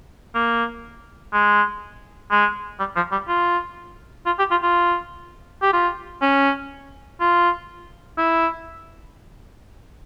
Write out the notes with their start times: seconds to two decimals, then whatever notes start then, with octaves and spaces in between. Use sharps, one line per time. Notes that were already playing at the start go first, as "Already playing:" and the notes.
0.35 A#3
1.33 G#3
2.31 G#3
2.79 G3
2.96 F3
3.12 G3
3.28 F4
4.26 F4
4.39 G4
4.51 F4
4.63 F4
5.62 G4
5.73 F4
6.22 C#4
7.20 F4
8.18 E4